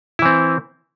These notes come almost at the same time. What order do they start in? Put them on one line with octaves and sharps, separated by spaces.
E4 E3 C4